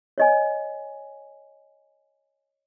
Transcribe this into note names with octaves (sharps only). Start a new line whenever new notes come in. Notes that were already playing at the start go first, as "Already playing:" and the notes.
C#5 D#5 G#5